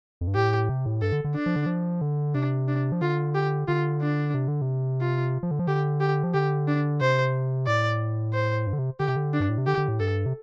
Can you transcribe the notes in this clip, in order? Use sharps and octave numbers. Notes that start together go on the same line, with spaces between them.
F2
G2
A2 G4
C3
A2
G2 A4
D3
D3
D4
F3
D3
F3
D3
C3 D4
D4
F3
D3 F4
G4
D3 F4
D4
C3
D3
C3
F4
F3
D3
F3
D3 G4
G4
F3
D3 G4
D4
C3 C5
A2 D5
C5
G2
D3
C3
D3 G4
C3
D3
D4
G2
A2
C3
D3 G4
D3
A2
G2 A4
C3